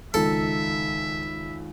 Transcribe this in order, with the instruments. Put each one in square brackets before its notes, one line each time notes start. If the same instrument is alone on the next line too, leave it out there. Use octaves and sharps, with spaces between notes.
[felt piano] C#2 D#3 [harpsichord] A4 [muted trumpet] E5